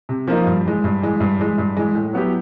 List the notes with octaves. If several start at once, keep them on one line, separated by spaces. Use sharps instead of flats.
C3
F3 A#3 D#4
G2
E3 G#3
G2
E3 G#3
G2
E3 G#3
G2
E3 G#3
A2
F#3 B3 E4 G4